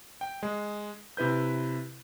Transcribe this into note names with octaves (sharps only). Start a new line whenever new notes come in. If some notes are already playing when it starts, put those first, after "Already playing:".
G5
G#3
C3 E4 B4 G6